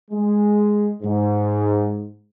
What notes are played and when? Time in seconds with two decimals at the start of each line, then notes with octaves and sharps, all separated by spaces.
0.11 G#3
1.03 G#2